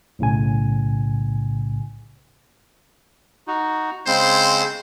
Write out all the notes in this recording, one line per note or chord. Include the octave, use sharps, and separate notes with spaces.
B1 A2 C#3 G#5
D#4 F#4
C#3 G#3 C4 C5